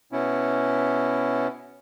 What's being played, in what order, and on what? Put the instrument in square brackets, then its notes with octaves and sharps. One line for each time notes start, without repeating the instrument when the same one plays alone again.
[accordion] B2 B3 C#4 E4